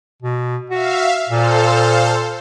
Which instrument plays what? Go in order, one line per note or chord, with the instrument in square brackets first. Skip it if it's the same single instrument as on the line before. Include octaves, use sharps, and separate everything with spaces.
[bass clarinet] B2
[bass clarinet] F#4 [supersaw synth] E5 F5
[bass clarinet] A#2 [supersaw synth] A4 C5 F5